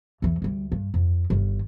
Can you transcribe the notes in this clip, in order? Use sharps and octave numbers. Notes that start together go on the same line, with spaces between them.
E2 E3
D2 G3
G2
F2
G1 D#3